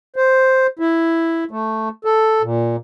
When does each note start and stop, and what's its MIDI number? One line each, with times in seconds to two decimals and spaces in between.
0.16 0.67 72
0.79 1.44 64
1.51 1.89 57
2.05 2.42 69
2.42 2.76 46